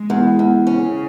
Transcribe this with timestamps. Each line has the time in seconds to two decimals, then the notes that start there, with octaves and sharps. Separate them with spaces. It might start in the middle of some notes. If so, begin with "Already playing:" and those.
Already playing: G#3
0.10 E2
0.39 E2
0.67 C#3 C#4